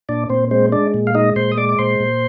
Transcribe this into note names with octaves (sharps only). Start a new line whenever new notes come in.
A#2 D4 D5
A#2 C4 C5
G#3 C4 C5
G#3 D4 D5
A#2
F5
G#3 D#4 D#5
A#2 C5 C6
D#6
G#3 D5 D6
D6
A#2 C5 C6
A#2